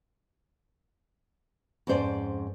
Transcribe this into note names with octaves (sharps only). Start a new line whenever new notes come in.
F2 G#2 C#4 C5 D5